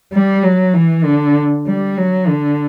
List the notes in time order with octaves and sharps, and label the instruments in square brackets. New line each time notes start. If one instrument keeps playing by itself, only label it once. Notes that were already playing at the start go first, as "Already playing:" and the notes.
[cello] G3
F#3
E3
D3
G3
F#3
D3